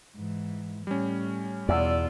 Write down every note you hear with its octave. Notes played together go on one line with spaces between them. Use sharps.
G#2 E3
A2 G3 C#4
E2 B2 F4 D5 E6